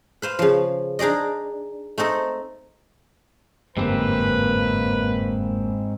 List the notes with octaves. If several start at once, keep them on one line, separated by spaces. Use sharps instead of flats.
B4 C5 F5
C#3 F3
D4 D#4 G#4 D5 D#5
A3 C4 D#4 A4
G1 F2 G#2 A#3 C4 G4 B4